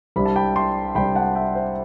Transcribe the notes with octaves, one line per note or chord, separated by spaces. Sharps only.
C2 C3 G3 D4 B5
A5
G5 B5
A5 C6
C2 C3 G3 D4 G5 B5
F#5 A5
E5 G5
C5